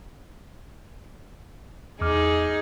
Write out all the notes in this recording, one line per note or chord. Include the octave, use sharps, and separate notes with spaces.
E2 D#4 G#4 D6 F6